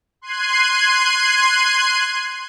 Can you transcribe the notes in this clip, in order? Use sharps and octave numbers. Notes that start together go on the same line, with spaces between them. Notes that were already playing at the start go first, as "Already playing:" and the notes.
C6 F#6 G#6 C7 D#7